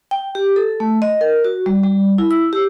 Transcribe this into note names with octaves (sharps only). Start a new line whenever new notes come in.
G5
G4
A4
A3
D#5
A#4
F#4
G3
G3
E4
E6
G4